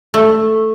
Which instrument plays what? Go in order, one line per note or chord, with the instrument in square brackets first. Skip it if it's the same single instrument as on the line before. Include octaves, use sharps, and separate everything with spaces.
[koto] A3